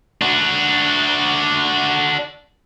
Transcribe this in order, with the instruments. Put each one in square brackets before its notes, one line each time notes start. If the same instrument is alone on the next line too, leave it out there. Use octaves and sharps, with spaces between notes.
[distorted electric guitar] D4 F#4